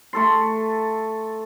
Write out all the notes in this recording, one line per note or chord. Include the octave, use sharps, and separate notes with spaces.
A3 A4 C6